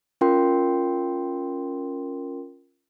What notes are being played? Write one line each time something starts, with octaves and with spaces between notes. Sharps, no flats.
C#4 F4 A#4 G5 C6